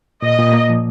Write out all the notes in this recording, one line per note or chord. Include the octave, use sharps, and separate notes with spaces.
A#2 D#5
A#2
A#3
F3